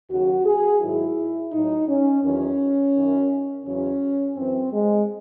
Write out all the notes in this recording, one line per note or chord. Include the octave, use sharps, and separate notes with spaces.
D#2 C#3 F#3 F#4
G#4
G#2 D#3 F#3 E4
A2 F#3 D#4
C#4
E2 D#3 F#3 C#4
F#2 D#3 F#3
E2 C#3 F#3 C#4
F#2 E3 C4
G#3